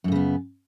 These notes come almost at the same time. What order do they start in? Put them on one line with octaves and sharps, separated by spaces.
F#2 A2 C#3 B3